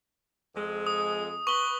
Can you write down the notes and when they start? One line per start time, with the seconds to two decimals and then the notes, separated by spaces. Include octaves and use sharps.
0.55 F2 G#3
0.87 D#6
1.47 B4 C#6 F#7 G7